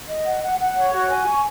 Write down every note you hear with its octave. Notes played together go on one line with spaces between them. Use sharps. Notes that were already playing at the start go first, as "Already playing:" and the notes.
D#5
F#5
F#5
F#5
C#5
F#4
G#5
C#6